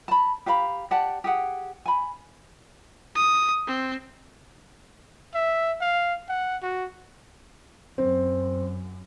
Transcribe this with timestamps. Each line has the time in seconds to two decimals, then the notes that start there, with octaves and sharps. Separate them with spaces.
0.08 A5 B5
0.46 G4 F5 A#5 B5
0.91 G4 D5 F#5 A5
1.24 G4 G#4 F#5
1.86 G#5 B5
3.15 D#6
3.67 C4
5.35 E5
5.81 F5
6.29 F#5
6.62 F#4
7.98 F#2 C4